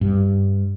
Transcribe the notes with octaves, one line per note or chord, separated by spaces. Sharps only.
G2